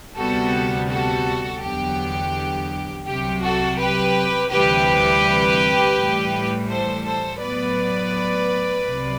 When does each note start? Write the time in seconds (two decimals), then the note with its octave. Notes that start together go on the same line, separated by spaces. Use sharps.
0.16 D2 C3 G3 B3 F#4 A4
0.89 F#4 A4
1.62 E2 D3 F#3 B3 G4
3.06 C2 C3 F#3 G4
3.43 F#4 A4
3.79 G4 B4
4.51 D2 C3 E3 G3 G4 B4
5.96 A2 E3 G3
6.69 A4 C5
7.05 A4 C5
7.41 A2 F#3 B3 B4 D5
8.87 C2 C3 F#3